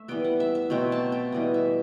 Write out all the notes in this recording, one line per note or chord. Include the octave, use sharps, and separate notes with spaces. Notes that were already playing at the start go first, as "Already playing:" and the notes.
Already playing: A3 E5
E3 G3 B3 G5
F#5
E5
E5
B2 F#3 A3 C4 G5
A5
G5
E3 G3 B3 D#5
E5